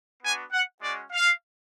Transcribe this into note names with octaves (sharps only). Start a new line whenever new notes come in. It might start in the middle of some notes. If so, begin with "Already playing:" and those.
B3 D4 F#4 G#5
F#5
G#3 C#4 F#4 D5
F5